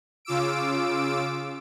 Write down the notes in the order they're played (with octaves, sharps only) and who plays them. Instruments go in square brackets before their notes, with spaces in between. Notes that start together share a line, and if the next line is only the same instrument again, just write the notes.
[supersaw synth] C#3 F4 D6 E6 D7